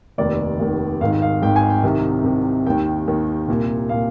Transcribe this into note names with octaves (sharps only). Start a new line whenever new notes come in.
F1 D#2 D#3 D5
F1 D#2 D#3
G#1 G#2 D#3 F5
F5
G#1 G#2 D#3 G5
G#5
G5
C2 C3 D#3
C2 C3 D#3
D#2 D#3 G5
D#2 D#3
C2 A#2
A#2 F5